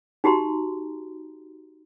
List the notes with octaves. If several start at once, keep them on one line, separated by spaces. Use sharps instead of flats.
D#4 F#4 G4 A#5 C6